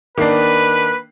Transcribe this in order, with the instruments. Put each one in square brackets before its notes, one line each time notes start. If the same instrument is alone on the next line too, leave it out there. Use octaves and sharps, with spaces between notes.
[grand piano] D#3 D4 [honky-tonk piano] A#3 C7 [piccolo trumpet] B4